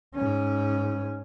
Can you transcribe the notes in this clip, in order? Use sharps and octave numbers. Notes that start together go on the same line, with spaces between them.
G#2 C#4